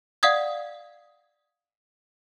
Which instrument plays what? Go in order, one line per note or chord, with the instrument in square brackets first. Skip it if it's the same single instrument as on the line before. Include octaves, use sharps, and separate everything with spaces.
[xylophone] D5 F5 F#5 D#6 G#6